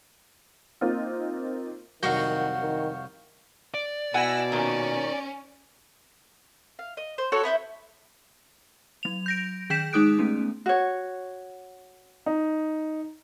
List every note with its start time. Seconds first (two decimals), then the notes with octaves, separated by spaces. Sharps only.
0.81 A#3 C4 D#4 F4
2.03 C2 F2 D#3 F#3 F#4 F5 C#6 G6
2.61 D#3
3.74 D5
4.14 B2 E4 F#5 G#5 E6 A#6
4.52 A#2 D#3 C#4
6.79 F5
6.97 D#5
7.18 C5
7.32 F#4 A4 C#5
7.43 B3 E4 B4 C5
9.03 F#3 F7
9.26 G6 A#6 D7
9.70 D#3 G#4 G5 G6 B6 E7
9.93 G#3 D#4 G#4 D#6 F#6 D7
10.19 A3 B3 C#4
10.66 F#4 C#5
12.26 D#4